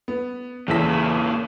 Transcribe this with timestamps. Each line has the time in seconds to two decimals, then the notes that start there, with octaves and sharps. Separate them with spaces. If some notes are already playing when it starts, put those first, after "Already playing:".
0.08 B3
0.68 E2 A#2 C#3 E4 B6